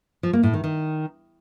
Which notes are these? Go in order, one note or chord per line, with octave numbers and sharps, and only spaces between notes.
F3
A#3
A2
D#3
D#3